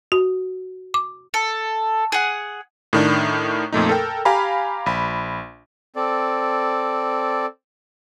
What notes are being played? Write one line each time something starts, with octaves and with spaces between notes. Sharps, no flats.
F#4
D6
A4
G#4 F#5
A2 D#3 D4
F2 A#2 A3 D#4
A4 A#4 G5
G4 F5 G#5 A#5 B5
A#1 B5
C4 A4 D5